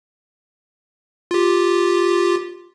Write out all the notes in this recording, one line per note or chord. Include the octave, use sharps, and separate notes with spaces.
F4 G4